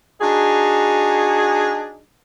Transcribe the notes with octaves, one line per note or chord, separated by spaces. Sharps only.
D4 D#4 F#4 G#4